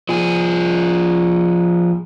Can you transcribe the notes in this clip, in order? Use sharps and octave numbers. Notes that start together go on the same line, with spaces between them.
F3 G#4